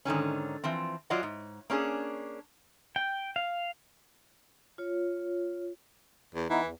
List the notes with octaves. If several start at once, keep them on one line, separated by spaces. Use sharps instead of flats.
G#2 D3 D#3 C#4
E3 F3 C4
F#3 F4 D5 D#5 F#5
G#2
A#3 C#4 D4 G#4
G5
F5
F4 C#5
E2
E3 B3 D#4 E4
E2